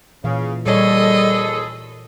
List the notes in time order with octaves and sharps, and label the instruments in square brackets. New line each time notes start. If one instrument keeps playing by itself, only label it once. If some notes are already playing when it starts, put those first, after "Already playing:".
[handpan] A#2 E3 F5 [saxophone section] C#3
[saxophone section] D#2 G#4 A4 [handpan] A#2 C#5 [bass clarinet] G3 [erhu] D#5